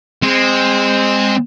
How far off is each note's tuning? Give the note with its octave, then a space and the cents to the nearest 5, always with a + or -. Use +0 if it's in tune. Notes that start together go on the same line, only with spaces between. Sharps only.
G#3 -20 C4 +0